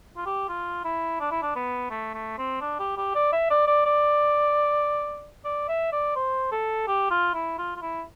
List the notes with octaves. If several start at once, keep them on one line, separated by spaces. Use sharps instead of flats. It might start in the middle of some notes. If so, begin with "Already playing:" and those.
F4
G4
F4
E4
D4
E4
D4
B3
A3
A3
C4
D4
G4
G4
D5
E5
D5
D5
D5
D5
E5
D5
C5
A4
G4
F4
E4
F4
F4
E4